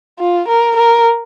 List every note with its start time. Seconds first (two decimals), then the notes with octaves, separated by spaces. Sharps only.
0.19 F4
0.48 A#4
0.76 A#4